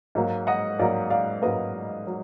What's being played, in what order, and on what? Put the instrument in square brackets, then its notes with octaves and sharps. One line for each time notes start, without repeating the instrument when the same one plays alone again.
[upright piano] G#2 F#3 A#3
D#5 F#5
G#2 F#3 A#3 D5 F5
D5 F5
G#2 F#3 A#3 B4 D#5
F#3